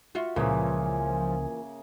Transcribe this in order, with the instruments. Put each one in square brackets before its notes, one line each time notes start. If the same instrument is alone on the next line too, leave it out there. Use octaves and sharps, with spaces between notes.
[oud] F4 F#4 [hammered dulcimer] E5
[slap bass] C#2 [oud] A#2 E3 [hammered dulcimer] C#3 A#3 G#4 [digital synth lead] F3